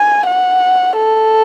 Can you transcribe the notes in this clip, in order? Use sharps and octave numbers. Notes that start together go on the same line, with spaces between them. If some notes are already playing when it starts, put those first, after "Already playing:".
Already playing: G#5
F#5
A4